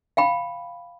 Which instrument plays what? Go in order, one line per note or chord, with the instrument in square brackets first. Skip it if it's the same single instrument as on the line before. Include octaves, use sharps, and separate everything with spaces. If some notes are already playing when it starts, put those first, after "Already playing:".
[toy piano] F5 G5 B5